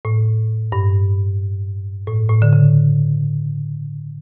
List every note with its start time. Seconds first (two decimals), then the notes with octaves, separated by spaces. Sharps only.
0.05 A2
0.72 G2
2.07 A2
2.29 A2
2.42 D3
2.53 C#3